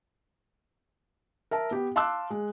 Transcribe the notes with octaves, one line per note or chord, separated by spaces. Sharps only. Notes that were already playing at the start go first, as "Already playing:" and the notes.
A#4 E5 A5
B3 G4
F5 A5 C6 D6 E6 F#6
G#3